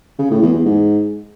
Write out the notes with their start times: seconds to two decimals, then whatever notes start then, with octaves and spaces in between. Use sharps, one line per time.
0.19 C#3
0.30 A2
0.42 E2
0.54 E2
0.65 G#2